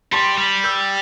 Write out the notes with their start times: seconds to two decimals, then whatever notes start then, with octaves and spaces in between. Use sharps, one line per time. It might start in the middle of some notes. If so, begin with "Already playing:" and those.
0.12 G3 A5 C6
0.38 G3
0.64 E6 G6